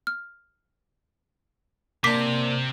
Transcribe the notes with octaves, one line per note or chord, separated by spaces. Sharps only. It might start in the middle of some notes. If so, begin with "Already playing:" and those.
F6
C3 A#3 C4 D4 D6 B6 C7